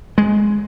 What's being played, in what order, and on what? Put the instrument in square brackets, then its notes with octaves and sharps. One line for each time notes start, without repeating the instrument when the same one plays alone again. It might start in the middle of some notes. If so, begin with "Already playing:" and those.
[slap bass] G#3